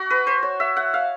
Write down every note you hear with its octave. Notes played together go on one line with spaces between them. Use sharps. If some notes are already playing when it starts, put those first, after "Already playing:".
Already playing: F#4
B4
C5
C#5
E5
F#5
F5